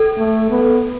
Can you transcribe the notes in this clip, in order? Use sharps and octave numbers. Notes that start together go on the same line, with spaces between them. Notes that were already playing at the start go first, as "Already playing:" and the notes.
Already playing: A4
A3
B3